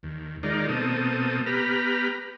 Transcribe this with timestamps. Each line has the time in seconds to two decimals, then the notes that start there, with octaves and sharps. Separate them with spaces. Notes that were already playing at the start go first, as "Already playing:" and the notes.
0.03 D#2
0.43 D#3 G#3 D#4 F4 A#4 D5
0.69 B2 A#3 C4 A4 D#6
1.46 B3 G4 A#5 B5 F6